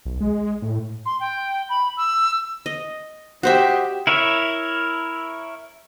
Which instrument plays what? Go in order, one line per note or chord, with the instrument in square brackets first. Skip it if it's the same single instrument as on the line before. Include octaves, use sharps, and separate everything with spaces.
[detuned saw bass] B1
G#3
A2
[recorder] C6
G5
B5
E6
[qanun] D#5
[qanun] F#4 C5 E5 [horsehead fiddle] G4 D#5
[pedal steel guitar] E4 A#4 C#5 E5